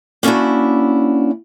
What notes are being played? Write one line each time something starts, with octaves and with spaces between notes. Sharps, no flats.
A#3 C#4 D4 E4 F#4